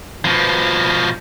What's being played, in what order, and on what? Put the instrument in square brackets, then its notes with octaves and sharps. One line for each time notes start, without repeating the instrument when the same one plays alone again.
[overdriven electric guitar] B2 F3